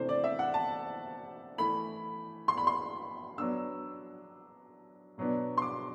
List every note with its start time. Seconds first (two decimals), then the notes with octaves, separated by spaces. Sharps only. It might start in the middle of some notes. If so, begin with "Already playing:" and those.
Already playing: C3 E3 A3 D4 C5
0.09 D5
0.24 E5
0.39 F#5
0.54 A5
1.58 E3 A3 E4 B5
2.48 C6
2.57 B5
2.67 C6
3.38 F#3 B3 D4 E6
5.18 B2 F#3 B3 D4
5.57 C6
5.62 D6